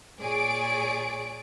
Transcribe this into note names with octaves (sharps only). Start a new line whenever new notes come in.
A#2 G#4 C#5 D5 D7